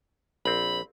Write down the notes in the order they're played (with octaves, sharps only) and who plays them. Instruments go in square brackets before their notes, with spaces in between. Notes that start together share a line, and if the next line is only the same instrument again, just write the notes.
[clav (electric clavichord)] A#1 C4 [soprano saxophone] B5